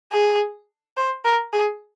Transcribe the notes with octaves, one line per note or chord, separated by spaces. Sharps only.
G#4
C5
A#4
G#4